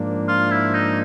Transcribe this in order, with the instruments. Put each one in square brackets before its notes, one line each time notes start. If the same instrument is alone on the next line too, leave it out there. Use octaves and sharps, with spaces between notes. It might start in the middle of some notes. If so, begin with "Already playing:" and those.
Already playing: [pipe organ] G#2 F3 A#3 D4
[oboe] F4
E4
D#4